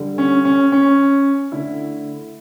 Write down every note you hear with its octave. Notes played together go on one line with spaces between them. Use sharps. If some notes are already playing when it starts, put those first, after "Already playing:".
Already playing: D3 G3
C#4
C#4
C#4
D3 A3 E4